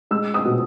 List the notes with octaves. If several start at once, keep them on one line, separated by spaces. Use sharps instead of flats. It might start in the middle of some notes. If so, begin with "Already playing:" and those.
G#3 E6
D#6
B2